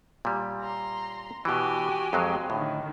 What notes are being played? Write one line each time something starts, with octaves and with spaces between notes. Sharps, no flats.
A#2 G3
A#5 C6
B2 E3 F#4 G4 G#5
F2 F#3 G#3
A2 D3 D#3